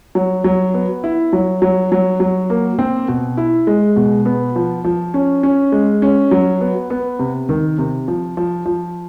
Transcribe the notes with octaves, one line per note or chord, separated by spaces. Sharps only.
F#3
F#3
B3
E4
F#3
F#3
F#3
F#3
A#3
C4
B2
E4
G#3
B2
B3
F3
F3
C#4
C#4
G#3
C#4
F#3
B3
B3
C3
D#3
C3
F3
F3
F3